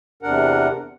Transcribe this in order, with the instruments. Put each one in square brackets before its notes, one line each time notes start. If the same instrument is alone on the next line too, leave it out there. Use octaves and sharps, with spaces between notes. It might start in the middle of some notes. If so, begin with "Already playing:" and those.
[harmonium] E2 C3 D4 A#4 F#5